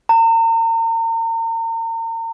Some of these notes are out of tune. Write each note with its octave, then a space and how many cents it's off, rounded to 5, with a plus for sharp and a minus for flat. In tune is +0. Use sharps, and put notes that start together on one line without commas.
A#5 -40